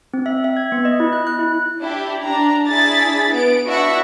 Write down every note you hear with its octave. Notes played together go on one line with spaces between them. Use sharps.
C4
E5
E5
G#6
B3
D#5
E4
F#6
F#6
E4
D4 E4 G4
D4 A#5
D4 E4 G#4 A6 B6
B3 D7
D4 E4 F#4 E5 F#5 C#6